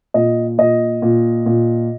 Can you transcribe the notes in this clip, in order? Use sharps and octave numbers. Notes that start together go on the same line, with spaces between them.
A#2 D#5
A#2 D#5
A#2
A#2